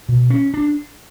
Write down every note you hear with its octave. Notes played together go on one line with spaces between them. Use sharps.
B2
C#4
D4